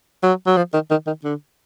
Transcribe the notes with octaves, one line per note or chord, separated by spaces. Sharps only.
F#3
F#3
F3
D#3
D#3
D#3
D3